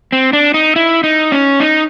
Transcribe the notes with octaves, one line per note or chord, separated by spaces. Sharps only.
C4
D4
D#4
E4
D#4
C#4
D#4